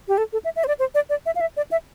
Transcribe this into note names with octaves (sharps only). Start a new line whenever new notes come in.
G4
A4
A4
E5
E5
C5
D5
C5
D5
D5
E5
F5
E5
D5
E5